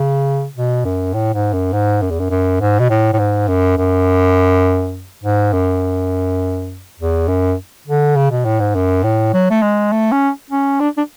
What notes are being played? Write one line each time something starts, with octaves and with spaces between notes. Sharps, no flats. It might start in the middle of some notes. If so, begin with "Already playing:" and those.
Already playing: C#3
B2
F#2
A2
G#2
F#2
G#2
F#2
E2
F#2
F#2
G#2
B2
A2
A2
G#2
F#2
F#2
G#2
F#2
E2
F#2
D3
C#3
B2
A2
G#2
F#2
A2
F#3
A3
G#3
A3
C#4
C#4
D4
D4